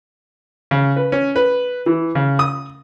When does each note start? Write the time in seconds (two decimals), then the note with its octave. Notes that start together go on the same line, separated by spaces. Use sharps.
0.71 C#3
0.96 B4
1.12 C#4
1.36 B4
1.86 E3
2.15 C#3
2.39 D#6